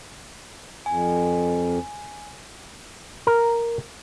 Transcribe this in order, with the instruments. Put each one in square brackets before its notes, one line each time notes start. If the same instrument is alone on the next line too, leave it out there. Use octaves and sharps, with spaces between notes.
[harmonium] F2 [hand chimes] G#5
[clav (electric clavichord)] A#4